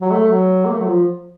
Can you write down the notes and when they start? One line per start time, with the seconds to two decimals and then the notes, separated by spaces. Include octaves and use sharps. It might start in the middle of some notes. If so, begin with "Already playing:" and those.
0.01 F#3
0.11 A3
0.27 F#3
0.66 A#3
0.72 A3
0.80 F#3
0.87 F3